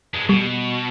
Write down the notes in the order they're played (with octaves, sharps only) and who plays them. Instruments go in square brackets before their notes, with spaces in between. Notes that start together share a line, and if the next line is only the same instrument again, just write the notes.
[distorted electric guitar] G2 G#3
[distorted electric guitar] B2 [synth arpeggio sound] G3